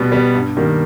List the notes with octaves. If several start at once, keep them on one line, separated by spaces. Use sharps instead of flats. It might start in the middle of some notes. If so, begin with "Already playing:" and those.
Already playing: B2 G3 B3
G3 B3
G2
D#3 G3 A#3